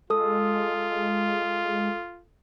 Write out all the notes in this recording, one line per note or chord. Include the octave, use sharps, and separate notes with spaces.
G#3 F4 A4 D#6